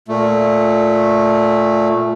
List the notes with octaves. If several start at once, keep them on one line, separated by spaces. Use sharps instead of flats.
A#2 A3